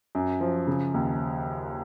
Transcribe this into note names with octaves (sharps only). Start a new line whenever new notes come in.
F#2
F3
C#3
D#2